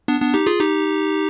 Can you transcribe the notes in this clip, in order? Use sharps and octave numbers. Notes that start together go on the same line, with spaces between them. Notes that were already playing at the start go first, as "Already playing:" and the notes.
B3 D4
B3 D4
D#4 G4
F4 G#4
D#4 G4